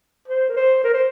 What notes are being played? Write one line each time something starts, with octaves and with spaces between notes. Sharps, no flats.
C5
A#4
C5
A#4
C5